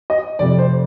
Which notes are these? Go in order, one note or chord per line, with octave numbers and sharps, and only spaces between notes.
D#5
F1 F2 C3 D5
C5